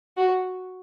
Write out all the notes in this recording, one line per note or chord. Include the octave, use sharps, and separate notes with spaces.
F#4